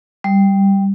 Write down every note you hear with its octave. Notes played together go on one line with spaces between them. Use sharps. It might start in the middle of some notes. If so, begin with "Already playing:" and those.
G3